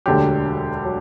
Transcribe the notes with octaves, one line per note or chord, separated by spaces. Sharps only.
E1 D2 D3 F#3 G4
F#3